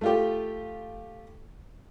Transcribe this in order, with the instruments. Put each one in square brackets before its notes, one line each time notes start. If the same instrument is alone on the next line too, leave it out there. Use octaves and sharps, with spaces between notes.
[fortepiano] A3 F4 G4